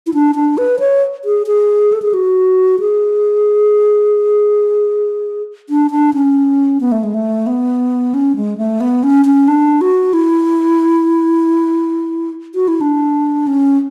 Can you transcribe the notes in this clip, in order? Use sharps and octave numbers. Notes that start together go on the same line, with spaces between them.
E4
D4
D4
B4
C#5
G#4
G#4
A4
G#4
F#4
G#4
D4
D4
C#4
B3
A3
G#3
A3
B3
C#4
G#3
A3
B3
C#4
C#4
D4
F#4
E4
F#4
E4
D4
C#4